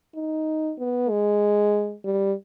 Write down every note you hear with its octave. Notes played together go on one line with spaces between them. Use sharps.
D#4
B3
G#3
G3